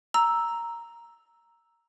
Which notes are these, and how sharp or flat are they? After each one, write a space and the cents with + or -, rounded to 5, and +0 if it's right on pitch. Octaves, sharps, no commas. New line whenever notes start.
A#5 +0 E6 +0